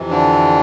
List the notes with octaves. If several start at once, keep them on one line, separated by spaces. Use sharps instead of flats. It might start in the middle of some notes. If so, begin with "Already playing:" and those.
Already playing: F2 C3 E3
D3 D4